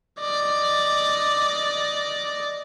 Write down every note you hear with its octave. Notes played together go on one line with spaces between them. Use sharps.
D5 D#5